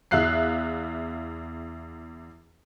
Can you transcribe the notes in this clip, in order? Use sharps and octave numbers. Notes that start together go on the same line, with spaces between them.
E2 E5 F5 F#6 C7